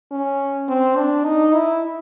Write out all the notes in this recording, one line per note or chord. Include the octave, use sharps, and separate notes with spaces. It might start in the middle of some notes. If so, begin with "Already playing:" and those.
C#4
C4
D4
D#4
E4